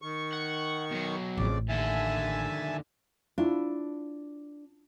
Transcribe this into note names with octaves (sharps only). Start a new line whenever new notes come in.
D#3 C#6
F#5
B2 F#3
A1 F2 C#3 D5
D#2 D3 E5 G#5 A5
D4 E4 F4